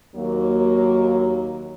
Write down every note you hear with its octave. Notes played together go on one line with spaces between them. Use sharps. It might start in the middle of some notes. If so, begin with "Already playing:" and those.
D#2 F#3 A#3